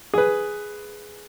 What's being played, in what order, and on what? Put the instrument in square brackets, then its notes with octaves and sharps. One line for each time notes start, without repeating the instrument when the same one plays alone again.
[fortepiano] G#4 B4